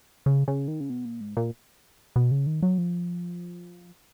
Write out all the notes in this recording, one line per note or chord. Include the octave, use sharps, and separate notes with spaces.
C#3
C#3
D#3
C#3
B2
A#2
G#2
A#2
B2
C#3
D#3
F#3
F3